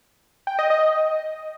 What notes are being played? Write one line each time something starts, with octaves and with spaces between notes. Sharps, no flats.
G5
D#5
D#5